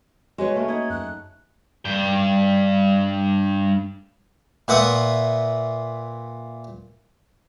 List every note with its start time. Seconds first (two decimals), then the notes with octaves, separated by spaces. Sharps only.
0.38 G#3 F#4 B4 C#5
0.55 A3 A#3 C#4 G#4 A#4
0.68 D#4 F#5 G#6
0.90 F#2 F#6
1.85 G2 G5
4.68 A#2 B4 E5 F#5 C#6 D#6